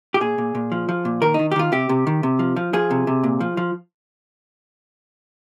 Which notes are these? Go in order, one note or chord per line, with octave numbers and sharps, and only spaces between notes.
G4
A#2 G#4
A#2
A#2
F3
F3
A#2
D#3 A#4
D#3 D#4
G4
D#3 F4
C3 G4
C3
D#3
C3
F3
F3
F3 G#4
C3
C3
A#2
F3
F3